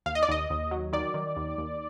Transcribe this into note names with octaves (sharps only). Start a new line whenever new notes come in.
D#2 F5
D#5
D5
D#2 D#5
D#2
F#3
D#3 D5
D#3
D#2
D#2